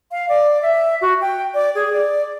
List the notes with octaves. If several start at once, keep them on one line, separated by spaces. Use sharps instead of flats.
F5
D5
E5
F#4
G5
D5
G#4
D5